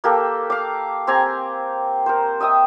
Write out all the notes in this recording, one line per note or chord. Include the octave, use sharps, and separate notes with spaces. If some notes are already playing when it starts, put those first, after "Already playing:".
A#3 G4 A4
F5 D6
C4 G4 G#5 A#5
A#4 C5
D#5 E5 G5 D#6